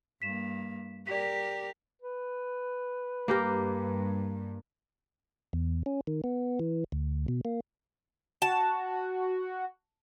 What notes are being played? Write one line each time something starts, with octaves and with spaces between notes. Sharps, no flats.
G2 A#3 B6 E7
G4 A#4 D5 B6
B4
G2 A#3 G4 A#4
E2
C#4
D#3
B3
E3
D2
B2
A#3
F#4 A5